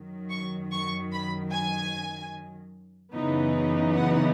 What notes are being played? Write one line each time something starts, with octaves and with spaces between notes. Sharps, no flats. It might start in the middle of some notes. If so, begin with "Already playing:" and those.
Already playing: F#2 D#3 F#3
C#6
C#6
B5
G#5
F#2 C#3 E3 B3 D#4
F#5